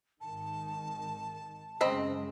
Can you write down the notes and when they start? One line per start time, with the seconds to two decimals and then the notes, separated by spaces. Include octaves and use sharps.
0.21 G#1 D#3 A5
1.81 F#2 C#3 G#3 C4 D#5 B5